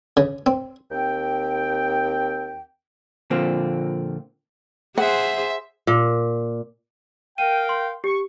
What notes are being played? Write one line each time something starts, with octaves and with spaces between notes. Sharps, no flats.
C#3
C4
D#2 C4 G5
A#2 D3 F3 A#3 C4
G#4 C5 E5 F#5
A#2
A#4 F5 G5 D#7
C6
G4 C#6